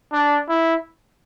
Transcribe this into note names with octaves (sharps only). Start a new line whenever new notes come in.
D4
E4